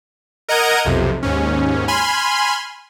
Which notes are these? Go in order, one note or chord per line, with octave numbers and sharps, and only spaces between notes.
A#4 D#5 F#5 A#5 G#6 D#7
B1 F2 C3
D#2 G#2 C#4
G#5 B5 C6 F6